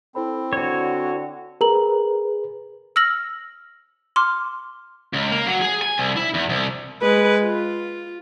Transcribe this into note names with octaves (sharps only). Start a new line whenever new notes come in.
C4 E4 A4 C5 B5
D3 F#4 C#5
G#4 A#4 B4 A#5 F#7
E6 F6 A#6 F#7
C6 D6 F6
C#2
A#3
F#3
G#4
G#5
C2
E4
E2
C2
G#3 B4
F4